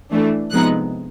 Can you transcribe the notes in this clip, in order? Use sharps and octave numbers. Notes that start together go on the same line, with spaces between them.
E3 A3 D4
C3 F3 G#3 B3 D#4 F#6